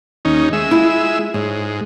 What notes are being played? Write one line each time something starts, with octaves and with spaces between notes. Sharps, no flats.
D#2 C#4 D#4
G#3 E5
E4 F4
G#2 C#5